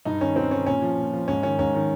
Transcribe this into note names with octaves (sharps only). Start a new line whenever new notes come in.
G2 D#4
D#3 C#4
G2 C4
D#3 C#4
A#2 C#4
F3
A#2
F3
G#2 C#4
D#3 C#4
G#2 C#4
D#3